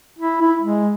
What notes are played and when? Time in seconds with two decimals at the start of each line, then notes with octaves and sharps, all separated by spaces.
0.19 E4
0.41 E4
0.62 G#3